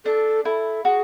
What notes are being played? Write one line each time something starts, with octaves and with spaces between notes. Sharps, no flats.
D4 A4
E4 A4
F#4 G#4